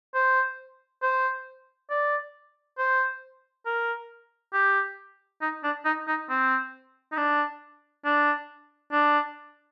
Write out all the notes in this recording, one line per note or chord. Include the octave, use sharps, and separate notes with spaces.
C5
C5
D5
C5
A#4
G4
D#4
D4
D#4
D#4
C4
D#4
D4
D4
D4